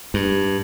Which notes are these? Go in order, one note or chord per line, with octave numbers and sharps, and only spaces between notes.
G2